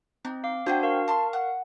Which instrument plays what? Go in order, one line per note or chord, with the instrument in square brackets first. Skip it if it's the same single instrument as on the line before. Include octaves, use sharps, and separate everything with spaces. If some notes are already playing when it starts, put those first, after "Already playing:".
[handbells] C4 [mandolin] D#4
[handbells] F5 D6
[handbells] D4 F#4 C6 [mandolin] C5 F#5 G5
[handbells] A#4 F5 C#6
[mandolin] A5 C6
F#5 F#6